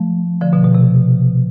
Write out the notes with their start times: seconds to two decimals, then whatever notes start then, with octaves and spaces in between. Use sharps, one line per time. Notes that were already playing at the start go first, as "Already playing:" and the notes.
Already playing: F3 A3
0.41 D3 F3
0.53 B2 D3
0.64 B2
0.75 C3